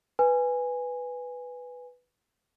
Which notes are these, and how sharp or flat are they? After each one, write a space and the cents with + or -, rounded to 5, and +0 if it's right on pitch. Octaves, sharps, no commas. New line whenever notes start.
B4 +5 G#5 -10